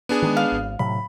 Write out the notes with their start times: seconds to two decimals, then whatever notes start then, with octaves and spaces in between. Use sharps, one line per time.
0.09 B3 D4 G#4
0.22 D#3 F3 G#3
0.37 F5
0.52 G#1
0.79 A2 C3 F#3 B5